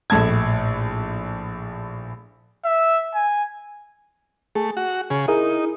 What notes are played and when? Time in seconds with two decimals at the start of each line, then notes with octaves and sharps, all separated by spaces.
0.10 A#1 A2 A5 G#6
2.65 E5
3.15 G#5
4.55 A3 G#4
4.77 F#4
5.10 C#3 G#4
5.28 D#4 E4 G#4 A#4